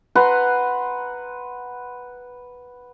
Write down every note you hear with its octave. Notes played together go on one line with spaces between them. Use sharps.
B4 F#5 A#5 C6